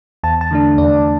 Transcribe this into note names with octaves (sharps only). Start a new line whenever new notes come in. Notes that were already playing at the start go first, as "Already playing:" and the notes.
E2 A5
A5
D3 A3 D4
E2 D5